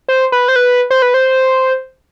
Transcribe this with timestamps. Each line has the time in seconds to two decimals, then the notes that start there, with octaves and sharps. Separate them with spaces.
0.08 C5
0.32 B4
0.48 C5
0.56 B4
0.91 C5
1.02 B4
1.14 C5